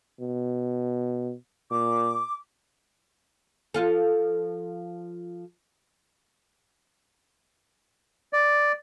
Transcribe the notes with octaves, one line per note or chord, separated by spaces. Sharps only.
B2
A#2 D6
F3 F4 A4
D5